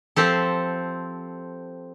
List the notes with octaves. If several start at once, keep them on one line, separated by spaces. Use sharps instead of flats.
F3 C4 G4 A4